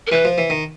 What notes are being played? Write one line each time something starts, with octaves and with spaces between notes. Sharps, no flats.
A#4
E3 B4
F3
E3
D#3